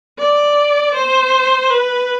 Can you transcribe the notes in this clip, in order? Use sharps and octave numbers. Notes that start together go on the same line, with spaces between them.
D5
C5
B4